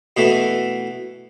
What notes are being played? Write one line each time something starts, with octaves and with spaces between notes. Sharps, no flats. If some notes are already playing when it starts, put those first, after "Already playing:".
B2 E3 A3